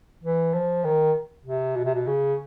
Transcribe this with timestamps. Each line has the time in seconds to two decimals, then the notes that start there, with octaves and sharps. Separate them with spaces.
0.24 E3
0.54 F3
0.85 D#3
1.46 C3
1.77 B2
1.85 C3
1.95 B2
2.07 C#3